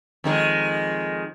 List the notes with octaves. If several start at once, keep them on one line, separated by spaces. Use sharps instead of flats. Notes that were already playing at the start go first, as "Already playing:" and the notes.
F2 D#3 G#3